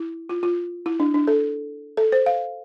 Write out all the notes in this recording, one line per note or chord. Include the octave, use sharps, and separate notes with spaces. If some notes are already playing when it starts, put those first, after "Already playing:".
Already playing: E4
F4
F4
E4
D4
D4
A4
A4
C5
F5